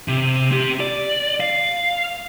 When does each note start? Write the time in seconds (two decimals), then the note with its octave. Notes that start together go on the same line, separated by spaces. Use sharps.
0.08 C3
0.51 C4 G4
0.80 D5
1.40 F5